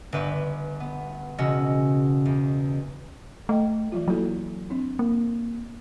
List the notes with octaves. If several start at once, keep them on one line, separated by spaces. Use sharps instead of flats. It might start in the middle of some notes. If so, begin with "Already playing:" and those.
G1 G4 B4 E5 C#6 F#6
B3
E1 C#3 C#4 F#4 D#5 E6
E2
A3 D#5 G5
E3 F#3 F4
F#3 A#3 E4 A4
C4 D4
A#3